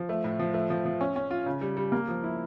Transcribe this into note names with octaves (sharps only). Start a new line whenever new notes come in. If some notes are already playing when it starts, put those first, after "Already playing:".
Already playing: F3
A3
A2
F3
A3
F3
F3
C#4
C#4
F4
C#3
G3
G3
A#3
F3
E4